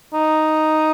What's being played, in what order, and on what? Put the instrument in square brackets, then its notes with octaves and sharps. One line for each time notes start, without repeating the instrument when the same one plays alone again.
[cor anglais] D#4